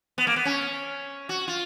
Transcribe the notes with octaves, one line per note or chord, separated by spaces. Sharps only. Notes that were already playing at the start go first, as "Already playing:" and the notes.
B3
A#3
B3
C#4
F#4
F4